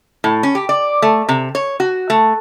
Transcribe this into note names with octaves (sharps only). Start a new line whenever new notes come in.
A2
C#4
G4
D5
A3
C3
C#5
F#4
A3